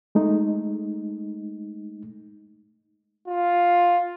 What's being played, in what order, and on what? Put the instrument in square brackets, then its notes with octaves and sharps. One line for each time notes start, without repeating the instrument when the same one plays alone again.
[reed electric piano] G#3 A3 D#4
[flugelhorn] F4